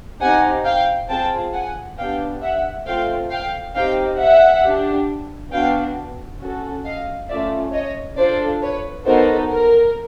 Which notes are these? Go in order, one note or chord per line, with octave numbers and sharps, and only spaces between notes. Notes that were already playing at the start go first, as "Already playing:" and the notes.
C4 D#4 G4 F#5 G#5
F5 G5
C4 F4 G#4 G5 A5
F#5 G#5
B3 D4 G4 F5 G5
E5 F#5
A3 C4 F4 F5 G5
F5 G5
C4 D#4 G4 F5 G5
E5 F#5
D4 G4
B3 D4 F#4 F5 G5
C#4 F#4 A4
D#5 F5
A3 C#4 F4 D5 E5
C#5 D#5
D4 F4 A4 C5 D5
B4 C#5
B3 D#4 F#4 A4 A#4 C5
A#4